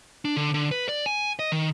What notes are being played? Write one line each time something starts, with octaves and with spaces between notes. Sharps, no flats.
D4
D3
D3
B4
D5
G#5
D#5
D#3